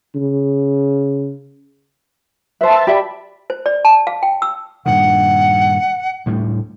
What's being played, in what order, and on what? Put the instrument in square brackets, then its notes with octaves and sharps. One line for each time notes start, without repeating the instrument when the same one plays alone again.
[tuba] C#3
[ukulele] B4 C5 [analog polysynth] E5 A5
[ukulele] G4 D5 E5 [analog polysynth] B5
[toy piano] C5
D5
A5
F5
G5
E6
[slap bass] G2 A#2 D#3 [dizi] F#5
[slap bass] D2 A2 G3